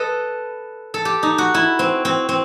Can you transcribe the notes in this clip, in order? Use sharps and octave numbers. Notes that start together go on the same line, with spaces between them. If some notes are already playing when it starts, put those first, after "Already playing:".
Already playing: A4 B4 D#5
A4
G4
D#4
F#4
E4
C4
C4
C4